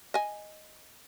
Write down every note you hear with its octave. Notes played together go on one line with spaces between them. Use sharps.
D#5 G#5